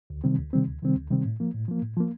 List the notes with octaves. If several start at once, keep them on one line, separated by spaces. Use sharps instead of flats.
D2
C3 D#3 G3 C4
D2
C3 D#3 G3 C4
D2
C3 D#3 G3 C4
D2
C3 D#3 G3 C4
A2
F3 A#3
A2
F3 A#3
A2
F3 A#3